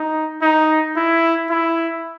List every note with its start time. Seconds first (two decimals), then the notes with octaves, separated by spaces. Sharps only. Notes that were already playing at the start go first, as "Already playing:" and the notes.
Already playing: D#4
0.42 D#4
0.97 E4
1.50 E4